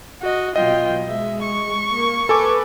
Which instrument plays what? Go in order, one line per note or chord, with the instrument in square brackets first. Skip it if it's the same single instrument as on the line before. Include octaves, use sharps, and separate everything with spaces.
[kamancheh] F#4 D#5
[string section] B2 F#3 [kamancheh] F4 G5 [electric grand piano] D#5
[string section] G#3 [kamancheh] E5
[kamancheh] C#6
[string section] A#3
[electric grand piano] A4 G#5 D6 [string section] B4